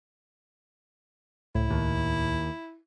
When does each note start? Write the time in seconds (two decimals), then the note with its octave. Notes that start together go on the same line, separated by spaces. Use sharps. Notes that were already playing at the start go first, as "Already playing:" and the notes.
1.55 C#2 A2 E4
1.70 D#2